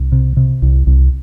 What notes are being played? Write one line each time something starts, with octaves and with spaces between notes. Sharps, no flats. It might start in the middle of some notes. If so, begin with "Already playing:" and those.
Already playing: C2
C3
C3
C2
C2